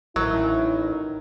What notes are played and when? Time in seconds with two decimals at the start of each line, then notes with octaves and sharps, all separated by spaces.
0.16 A1 D#3 F#3 E4